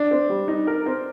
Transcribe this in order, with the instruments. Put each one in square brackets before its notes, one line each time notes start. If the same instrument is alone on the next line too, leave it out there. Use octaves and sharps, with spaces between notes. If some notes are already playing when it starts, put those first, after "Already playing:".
Already playing: [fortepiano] D4
[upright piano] C4
G3
D#4
A#4
C4